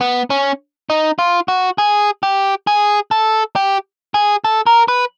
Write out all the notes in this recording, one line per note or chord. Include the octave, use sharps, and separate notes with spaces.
B3
C#4
D#4
F4
F#4
G#4
G4
G#4
A4
G4
G#4
A4
A#4
B4